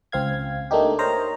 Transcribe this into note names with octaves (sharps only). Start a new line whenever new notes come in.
C#2 C4 F5 G#6
A3 A#3 D4 D#4 G4
A#4 C5 C#5 D#5 A#5